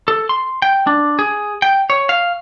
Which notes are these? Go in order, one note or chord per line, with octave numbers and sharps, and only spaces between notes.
A4
C6
G5
D4
G#4
G5
C#5
F5